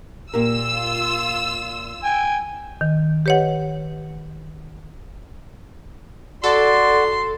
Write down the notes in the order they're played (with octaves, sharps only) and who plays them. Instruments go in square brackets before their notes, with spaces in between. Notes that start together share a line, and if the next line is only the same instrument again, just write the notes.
[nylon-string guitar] A#2 G4 A#4 [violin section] F4 E6
[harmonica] G5 G#5
[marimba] D#3
G4 B4 C#5 D#5 F#5
[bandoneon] F#4 [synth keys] A4 [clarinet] D5 [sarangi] C6